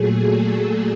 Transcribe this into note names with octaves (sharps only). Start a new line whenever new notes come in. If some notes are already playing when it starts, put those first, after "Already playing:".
Already playing: A#2 F#3 A3 G#4
A4